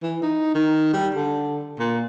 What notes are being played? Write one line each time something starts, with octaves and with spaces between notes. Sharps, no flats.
E3
D#4
D#3
G3
D3
A#2